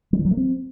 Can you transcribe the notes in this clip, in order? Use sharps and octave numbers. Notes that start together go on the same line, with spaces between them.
G3
E3
F#3
A3
C4